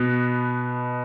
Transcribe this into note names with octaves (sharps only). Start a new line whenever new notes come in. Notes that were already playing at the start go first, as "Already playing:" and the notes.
Already playing: B2 B3